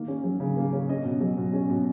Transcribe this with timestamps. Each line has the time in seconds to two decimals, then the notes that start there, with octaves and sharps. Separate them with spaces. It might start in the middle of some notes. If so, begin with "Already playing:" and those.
Already playing: D#3 A#3
0.08 C#4
0.24 F#3
0.40 C#3
0.57 A#3
0.73 C#4
0.89 C#4 D#5
1.05 B2
1.21 F#3
1.37 B2
1.53 C#4
1.69 B2